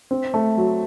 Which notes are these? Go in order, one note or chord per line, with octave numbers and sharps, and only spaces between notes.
C4
A3
F#3